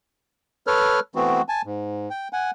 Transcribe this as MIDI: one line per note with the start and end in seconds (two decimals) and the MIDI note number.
0.67 1.00 69
0.67 1.00 71
0.67 1.00 73
0.67 1.00 89
1.15 1.42 52
1.15 1.42 57
1.15 1.42 59
1.15 1.42 60
1.15 1.42 66
1.48 1.62 80
1.48 1.62 81
1.65 2.09 44
2.10 2.28 79
2.33 2.51 78
2.33 2.51 80